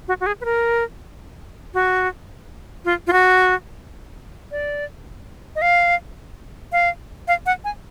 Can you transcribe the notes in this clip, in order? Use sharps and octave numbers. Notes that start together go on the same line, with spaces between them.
F#4
F#4
G#4
B4
A#4
F#4
F4
F4
F#4
D5
D#5
F5
F5
F5
F#5
G#5